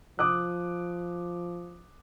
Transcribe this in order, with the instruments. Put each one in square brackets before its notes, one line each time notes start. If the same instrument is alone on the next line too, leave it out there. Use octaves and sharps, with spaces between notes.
[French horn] F3 [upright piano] D6 D#6 F#6